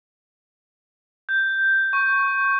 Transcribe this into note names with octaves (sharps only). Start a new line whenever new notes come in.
G6
C#6